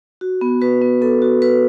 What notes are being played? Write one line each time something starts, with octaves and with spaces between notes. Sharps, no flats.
F#4
B3
F#4 B4
B3
B3 A4
F#4
F#4 B4